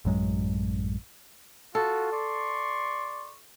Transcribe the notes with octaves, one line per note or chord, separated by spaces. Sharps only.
A1 F#2 F#3 G#3
F4 F#4 A4
D5 C6 C#6